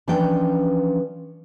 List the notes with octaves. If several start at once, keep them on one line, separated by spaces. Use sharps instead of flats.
E3 F3 C#4 D4 B4 G5